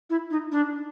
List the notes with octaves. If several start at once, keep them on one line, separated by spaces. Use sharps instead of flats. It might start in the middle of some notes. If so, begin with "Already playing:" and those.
E4
D#4
D4